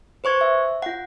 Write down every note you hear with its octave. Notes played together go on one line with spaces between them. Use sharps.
B4 C5 C#6 G#6
E5
F4 F#5